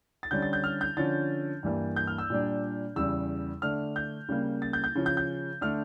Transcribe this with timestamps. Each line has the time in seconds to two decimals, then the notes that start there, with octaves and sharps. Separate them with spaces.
0.23 A6
0.31 D3 G3 C#4 G6
0.42 A6
0.53 G6
0.64 F6
0.81 G6
0.97 D3 F3 C#4 A6
1.63 G2 E3 G3 A#3
1.96 G6
2.07 F6
2.18 E6
2.30 A#2 G3 D4
2.96 E2 C#3 G3 E6
3.62 D3 A3 D4 F6
3.96 G6
4.29 C#3 G3 A#3
4.62 A6
4.73 G6
4.84 G6
4.95 C#3 F3 C#4
5.06 G6
5.17 G6
5.61 D3 A3 D4 F6